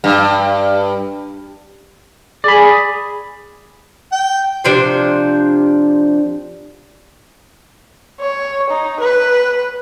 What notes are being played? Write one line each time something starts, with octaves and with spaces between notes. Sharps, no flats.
G2
G#4 D5 B5
G5
C3 F3 D4 C5
C#5
D#4
B4